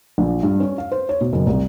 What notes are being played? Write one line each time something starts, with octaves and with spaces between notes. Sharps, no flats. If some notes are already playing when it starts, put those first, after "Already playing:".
A#1
G2
C#4
F5
C5
C#5
B2
F#1
C2